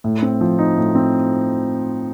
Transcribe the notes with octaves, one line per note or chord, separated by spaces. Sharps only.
A2
C4
F3
D#4
A2
C4